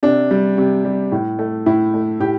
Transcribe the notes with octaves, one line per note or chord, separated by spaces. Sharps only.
C3 D4
G3
C3
G3
A2
A3
A2 E4
A3
A2 G4